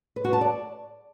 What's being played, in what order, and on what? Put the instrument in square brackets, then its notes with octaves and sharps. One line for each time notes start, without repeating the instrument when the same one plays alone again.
[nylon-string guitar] B4
F#4
A5
D5